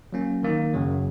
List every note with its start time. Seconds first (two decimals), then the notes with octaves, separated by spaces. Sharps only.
0.13 F#3 A#3 C#4
0.43 D#3 A#3 D#4
0.74 F#2 C#3 F#3